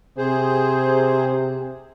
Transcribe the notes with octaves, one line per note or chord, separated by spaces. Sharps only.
C3 G#4 C5